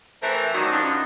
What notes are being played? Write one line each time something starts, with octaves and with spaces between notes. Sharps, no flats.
E3 A3 C4 A#4 C5
D#3 F#3 A3 D4 D#4 F#4
F#2 D4 D#4 F4 F#4